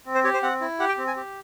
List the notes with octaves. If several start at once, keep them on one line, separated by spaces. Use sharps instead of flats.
C4
C5
G4 C#5
C5
C4 F#5
E4
G4 F#5
G5
C4
G#5
G4